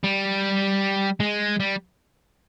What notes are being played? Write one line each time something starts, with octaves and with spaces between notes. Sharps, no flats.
G3
G#3
G3